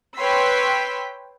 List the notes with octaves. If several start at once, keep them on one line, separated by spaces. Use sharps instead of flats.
B4 C#5 G5 C6 E6 B6